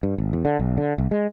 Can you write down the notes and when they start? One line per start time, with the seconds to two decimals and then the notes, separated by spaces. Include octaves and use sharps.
0.03 G2
0.18 G#1
0.33 E2
0.45 D3
0.59 B1
0.77 D3
0.98 C2
1.11 G#3